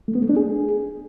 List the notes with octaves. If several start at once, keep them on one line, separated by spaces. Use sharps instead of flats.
A3
B3
A3
D4
G#4